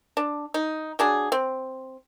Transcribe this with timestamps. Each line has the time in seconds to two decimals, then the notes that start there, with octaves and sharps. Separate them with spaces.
0.17 D4
0.54 D#4
0.99 F#3 D4 G#4
1.32 C4